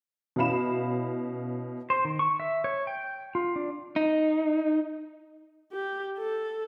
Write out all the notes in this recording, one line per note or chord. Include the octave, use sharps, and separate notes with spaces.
B2 C#4 E4 F5 B5 E7
C5
D#3
C#6
E5
C#5
G5
F4
D4
D#4
G4
A4